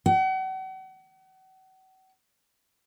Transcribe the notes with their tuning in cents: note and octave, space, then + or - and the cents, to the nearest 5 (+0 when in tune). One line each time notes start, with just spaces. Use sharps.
F#5 +40